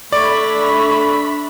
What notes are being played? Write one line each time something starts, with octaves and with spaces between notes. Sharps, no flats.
A3 D4 D5 B5 C#6